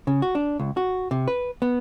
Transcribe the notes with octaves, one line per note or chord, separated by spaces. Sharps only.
C#3
F#4
D4
C#2
F#4
C3
B4
B3